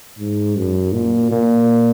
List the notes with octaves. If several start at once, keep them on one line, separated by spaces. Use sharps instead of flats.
G#2
F#2
A#2
A#2